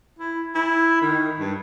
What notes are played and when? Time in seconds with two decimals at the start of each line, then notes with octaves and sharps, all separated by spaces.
0.19 E4
0.55 E4
1.02 D#3
1.39 G2